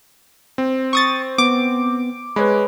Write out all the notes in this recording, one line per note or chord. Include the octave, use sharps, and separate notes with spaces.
C4
C#6 D#6 A6
B3 D6
G#3 B4 C#5 B5